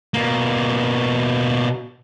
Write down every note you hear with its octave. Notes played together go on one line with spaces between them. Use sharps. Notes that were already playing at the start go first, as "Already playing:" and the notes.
B2 A#3